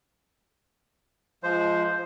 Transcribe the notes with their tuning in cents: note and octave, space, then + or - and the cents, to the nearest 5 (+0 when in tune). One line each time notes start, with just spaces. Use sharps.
F3 -10 G#3 +10 C5 +0